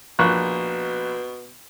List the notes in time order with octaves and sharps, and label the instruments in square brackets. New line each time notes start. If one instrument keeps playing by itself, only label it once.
[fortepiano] A#1 C#6 F#6 [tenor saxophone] B2